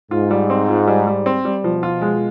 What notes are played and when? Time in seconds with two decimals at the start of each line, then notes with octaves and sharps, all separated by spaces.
0.11 G#2 F4
0.31 G3
0.50 C4
0.69 F4
0.87 G3
1.07 G3
1.26 C4
1.45 G3
1.64 B2 F3
1.83 F4
2.02 G#3